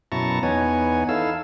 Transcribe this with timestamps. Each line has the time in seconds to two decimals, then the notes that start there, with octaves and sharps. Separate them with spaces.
0.12 F#2 B2 E4 A5 A#5 C#6
0.43 E2 B3 D#4 C#5 G#5
1.09 D#4 E4 A4 F5 E6